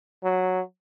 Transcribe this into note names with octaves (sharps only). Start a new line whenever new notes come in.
F#3